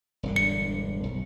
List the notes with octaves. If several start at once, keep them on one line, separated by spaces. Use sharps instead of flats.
E1 G2 D3
C#7
B1